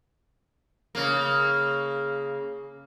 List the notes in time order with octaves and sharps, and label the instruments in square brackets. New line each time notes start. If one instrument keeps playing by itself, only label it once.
[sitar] C#3 A#3